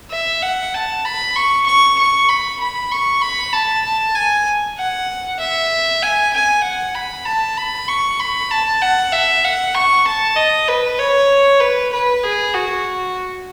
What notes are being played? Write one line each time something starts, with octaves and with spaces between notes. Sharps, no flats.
E5
F#5
A5
B5
C#6
C#6
C#6
B5
B5
C#6
B5
A5
A5
G#5
F#5
E5
G#5
G#5
F#5
B5
A5
B5
C#6
B5
A5
F#5
E5
F#5
C#6
A5
D#5
B4
C#5
B4
B4
G#4
F#4